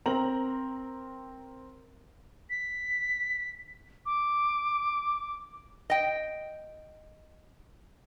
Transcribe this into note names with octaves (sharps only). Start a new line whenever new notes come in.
C4 A#4 A#5 F#7
B6
D6
D#5 G5